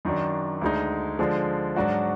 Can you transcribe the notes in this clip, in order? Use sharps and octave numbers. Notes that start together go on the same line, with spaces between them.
F#2 D#3 F#3 D4
D2 D3 G#3 D#4
D3 F3 G#3
G#2 F#3 D4 F#4